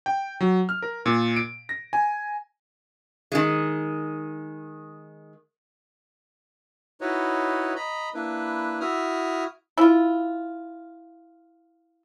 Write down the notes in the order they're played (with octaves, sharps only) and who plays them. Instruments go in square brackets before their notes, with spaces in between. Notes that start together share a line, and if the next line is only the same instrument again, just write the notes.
[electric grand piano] G5
F#3
F6
A#4
A#2
D7
A#6
G#5
[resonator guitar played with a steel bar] D#3 G#3
[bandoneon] D#4 E4 F#4 B4 C#5 D#5
D#5 A#5 B5
A#3 D4 E4 B4
E4 F#4 E5 D#6 F6
[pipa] E4 F4